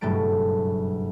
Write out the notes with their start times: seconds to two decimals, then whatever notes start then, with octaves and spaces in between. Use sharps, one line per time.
0.01 F#1 G2 B2 A3 A6 D7